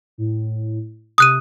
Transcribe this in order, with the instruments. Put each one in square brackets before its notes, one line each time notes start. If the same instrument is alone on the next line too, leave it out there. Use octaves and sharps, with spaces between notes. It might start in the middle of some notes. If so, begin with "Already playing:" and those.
[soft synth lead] A2
[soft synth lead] C3 [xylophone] D#6 F#6 D#7